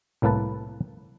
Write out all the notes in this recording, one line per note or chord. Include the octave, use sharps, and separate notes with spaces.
C2 A2 A#3 A4 B4 A5